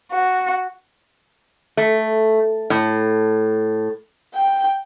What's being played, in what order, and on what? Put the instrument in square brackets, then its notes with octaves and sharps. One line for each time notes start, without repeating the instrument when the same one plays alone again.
[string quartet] F#4
[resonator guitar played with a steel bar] A3
A2
[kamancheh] G5